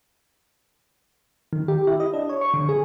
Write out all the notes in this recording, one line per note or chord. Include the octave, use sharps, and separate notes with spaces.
D#3
G4
E4
D#5
D4
C#5
C#6
D3
G#4